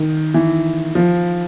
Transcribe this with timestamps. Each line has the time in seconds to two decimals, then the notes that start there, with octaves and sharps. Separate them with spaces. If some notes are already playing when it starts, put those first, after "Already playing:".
Already playing: D#3
0.34 E3
0.95 F3